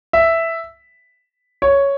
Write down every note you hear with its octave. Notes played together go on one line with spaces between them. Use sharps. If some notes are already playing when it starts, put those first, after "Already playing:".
E5
C#5